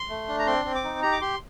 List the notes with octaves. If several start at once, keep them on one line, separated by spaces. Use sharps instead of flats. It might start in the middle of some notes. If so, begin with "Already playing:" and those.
Already playing: C6
A3
D4
A#5
C4 C6
C4
D6
D#4
G4 A#5
D6
G4 C6